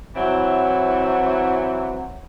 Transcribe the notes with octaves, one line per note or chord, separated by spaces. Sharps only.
E3 F#3 C4 E4